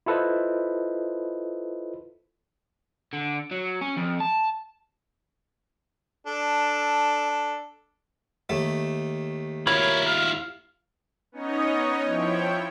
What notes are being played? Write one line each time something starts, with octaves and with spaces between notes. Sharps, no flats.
E4 F4 A4 B4 C5 D#5
D3
F#3
C#4
F2
A5
D4 A4
D#2 A3
E4 F4 A#4 C#5 B5
F5
B3 C#4 D#4 C#5 D#5
F3 E4 C#5 G5